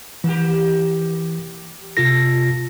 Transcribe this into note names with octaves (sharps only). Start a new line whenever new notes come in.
E3 A#3 G4
C3 F4 A4 A#6